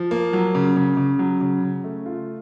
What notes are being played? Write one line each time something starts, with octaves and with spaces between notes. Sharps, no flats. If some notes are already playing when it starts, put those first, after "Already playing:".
Already playing: F3
A#3
F#3
C#3
C#3
C#3
F#3
C#3
C#3
A3
F4